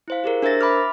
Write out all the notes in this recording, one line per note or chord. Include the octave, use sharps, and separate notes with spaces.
E4 C5 F5
G4 G#4 A#4
D4 A#4 C5 E5 A6 A#6
E5 B5 D6 F6